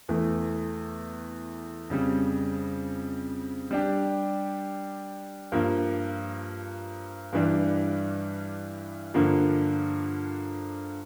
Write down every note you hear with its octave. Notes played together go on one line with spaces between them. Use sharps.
E2 E3 A3
F2 C#3 G3
G3 D4 G4
G2 F3 A#3
G2 E3 G3 D4
G2 D3 F3 A#3